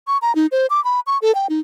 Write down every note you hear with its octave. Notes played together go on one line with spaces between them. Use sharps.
C#6
A#5
D#4
C5
D6
B5
C#6
A4
G5
D#4